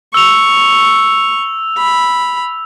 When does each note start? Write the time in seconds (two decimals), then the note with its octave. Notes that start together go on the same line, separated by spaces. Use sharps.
0.14 C#6 E6 F7
1.78 B5